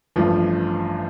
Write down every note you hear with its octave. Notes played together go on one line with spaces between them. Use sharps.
A1 G2 F3